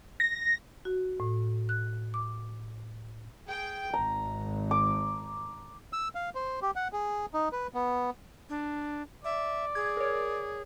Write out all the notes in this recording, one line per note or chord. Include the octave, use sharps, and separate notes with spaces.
A#6
F#4
A2
F#6
D6
G#4 G5
G#1 A#5
D6
E6
F5
C5
G4
F#5
G#4
D#4
B4
B3
D4
D5 E5
G#4 G#6
A#4 C#5